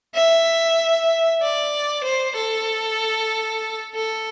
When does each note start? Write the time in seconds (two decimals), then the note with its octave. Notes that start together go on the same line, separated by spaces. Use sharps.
0.15 E5
1.42 D5
2.04 C5
2.36 A4
3.95 A4